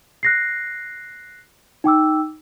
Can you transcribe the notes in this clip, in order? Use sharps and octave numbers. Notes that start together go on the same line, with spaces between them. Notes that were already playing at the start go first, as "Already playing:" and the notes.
F#6 A#6 C7
D#4 G5 D6 E6